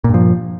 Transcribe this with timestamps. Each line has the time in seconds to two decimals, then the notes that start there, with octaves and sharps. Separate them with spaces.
0.04 A#2
0.09 G2
0.14 F3